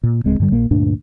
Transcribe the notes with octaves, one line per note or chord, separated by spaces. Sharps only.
A#2
D1 C#2 G#3 C4
G2 D3 G3
A#1 A#2 A#3
D2 G2 A#2 D4